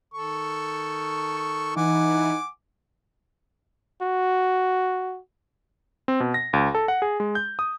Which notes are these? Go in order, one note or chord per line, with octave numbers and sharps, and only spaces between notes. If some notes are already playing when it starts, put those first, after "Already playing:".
D#3 A4 C#6
E3 D#4 F#5 G#5 D6
F#4
C4
B2
A#6
C#2
A4
F#5
G#4
G#3
G6
D#6